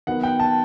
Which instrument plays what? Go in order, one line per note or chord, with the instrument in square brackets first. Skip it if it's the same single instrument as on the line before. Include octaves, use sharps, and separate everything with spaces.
[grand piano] D#3 F#3 B3 F#5
G5
A5